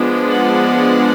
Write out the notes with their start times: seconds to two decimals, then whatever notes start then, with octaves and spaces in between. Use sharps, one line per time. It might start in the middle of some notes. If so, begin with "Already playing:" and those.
Already playing: F3 G#3 B3 D4
0.32 F#5